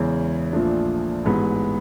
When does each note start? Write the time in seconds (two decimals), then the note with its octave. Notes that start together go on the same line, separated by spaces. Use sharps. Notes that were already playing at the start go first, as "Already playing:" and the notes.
Already playing: E2 C#3 E3 G#3
0.53 A#1 A#2 F3 A3 D4
1.24 A1 G#2 E3 G#3 B3